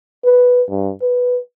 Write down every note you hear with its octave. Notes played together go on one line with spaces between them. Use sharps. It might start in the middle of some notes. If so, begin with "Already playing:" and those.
B4
G2
B4